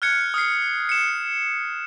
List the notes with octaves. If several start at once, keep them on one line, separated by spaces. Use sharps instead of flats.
F6 F#6 G#6 C#7
D#6 F6 C7
C#7 E7